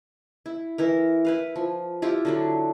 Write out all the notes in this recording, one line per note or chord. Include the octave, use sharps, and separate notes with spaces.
E4
E3 E4 A#4
E4 B4 F5
F3
E4 F4 G4
D3 F#3 D4